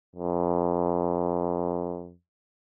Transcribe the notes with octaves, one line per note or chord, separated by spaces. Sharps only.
F2